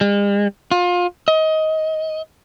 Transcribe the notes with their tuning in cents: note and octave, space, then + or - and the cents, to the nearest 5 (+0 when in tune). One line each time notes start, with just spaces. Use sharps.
G#3 -45
F4 +25
D#5 +20